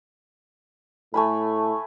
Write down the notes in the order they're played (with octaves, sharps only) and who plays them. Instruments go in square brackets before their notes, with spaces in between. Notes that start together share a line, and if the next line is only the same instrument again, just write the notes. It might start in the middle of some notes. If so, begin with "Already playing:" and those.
[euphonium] A2 [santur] A3 G#5 B5